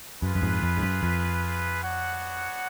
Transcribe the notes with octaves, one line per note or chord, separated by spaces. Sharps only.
F#2 F4 G#4 B4
F#2
F2 G#2
F2
G#2
F#2
F2
B3 D4 F#4 C#5 F#5